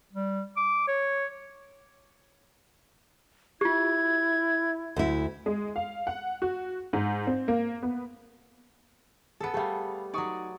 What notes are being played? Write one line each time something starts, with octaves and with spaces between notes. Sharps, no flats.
G3
D6
C#5
E4 F4 G4 G#6
D2 E4
G#3
F5
F#5
F#4
G#2
C4
A#3
B3
B3 G#4 A4 C#7
G3 A3 G#4 F5
F#3 D#4 D5 C#6 D#6